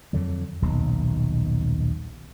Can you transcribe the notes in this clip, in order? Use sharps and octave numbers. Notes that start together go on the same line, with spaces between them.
F2 D3 F#3
D#1 B1 B2